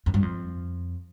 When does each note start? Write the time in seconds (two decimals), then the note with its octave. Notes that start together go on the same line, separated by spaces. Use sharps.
0.06 F2
0.14 G2
0.23 F2